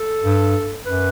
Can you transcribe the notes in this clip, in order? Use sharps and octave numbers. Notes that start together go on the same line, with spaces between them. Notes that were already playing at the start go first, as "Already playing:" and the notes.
Already playing: A4
G2
F#2 B4